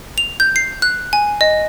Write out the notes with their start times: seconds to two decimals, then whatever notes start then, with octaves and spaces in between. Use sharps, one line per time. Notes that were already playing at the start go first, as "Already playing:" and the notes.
0.18 F7
0.40 G6
0.56 C7
0.82 F#6
1.13 G#5
1.41 D#5